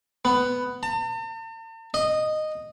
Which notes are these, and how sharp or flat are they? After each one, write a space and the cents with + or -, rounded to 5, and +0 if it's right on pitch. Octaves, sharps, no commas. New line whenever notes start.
B3 +10
A5 +45
D#5 -10